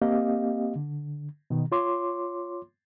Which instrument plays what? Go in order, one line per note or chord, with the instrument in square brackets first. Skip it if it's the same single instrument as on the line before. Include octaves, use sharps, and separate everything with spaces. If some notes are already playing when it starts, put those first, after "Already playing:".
[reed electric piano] A#3 C4 G4 D#5 F5
D3
B2 D#3
F4 C#5 C6 D6